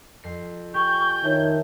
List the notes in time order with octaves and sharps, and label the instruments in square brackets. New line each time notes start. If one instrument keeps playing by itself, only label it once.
[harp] F2 C7
[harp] G4 G#5 [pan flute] C#6 [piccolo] G6
[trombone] D#3 [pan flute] C#5 [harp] E5 A5